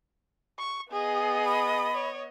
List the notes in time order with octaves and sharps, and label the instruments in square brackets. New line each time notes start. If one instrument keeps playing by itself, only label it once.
[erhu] C#6
[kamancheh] B3 D#5 [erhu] G#4
[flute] B5
[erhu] C#5